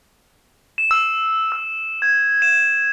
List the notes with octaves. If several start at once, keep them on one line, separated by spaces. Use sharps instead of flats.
E7
E6
E6
G#6
E7